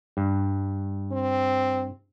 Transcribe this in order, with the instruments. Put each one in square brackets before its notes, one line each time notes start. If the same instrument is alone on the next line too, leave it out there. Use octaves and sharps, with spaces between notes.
[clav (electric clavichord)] G2
[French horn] C4